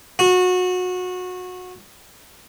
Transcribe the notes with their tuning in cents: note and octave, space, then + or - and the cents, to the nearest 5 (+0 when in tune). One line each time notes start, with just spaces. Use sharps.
F#4 -25